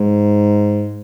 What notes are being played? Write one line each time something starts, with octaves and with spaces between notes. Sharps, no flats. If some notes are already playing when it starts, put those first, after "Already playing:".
Already playing: G#2